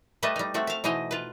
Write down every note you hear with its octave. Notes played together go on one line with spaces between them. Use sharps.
G3 A3 B4 D#5 E5
G3 D#4
A3 C4 F#4
E5 F5
B2 E3 D#4 C5 D#5
F4 B4